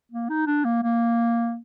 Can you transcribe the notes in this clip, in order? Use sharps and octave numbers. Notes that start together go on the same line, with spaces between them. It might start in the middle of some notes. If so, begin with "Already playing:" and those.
A#3
D#4
D4
A#3
A#3